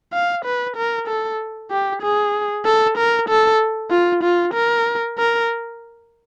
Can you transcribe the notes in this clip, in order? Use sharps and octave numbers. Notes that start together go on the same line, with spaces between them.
F5
B4
A#4
A4
G4
G#4
A4
A#4
A4
F4
F4
A#4
A#4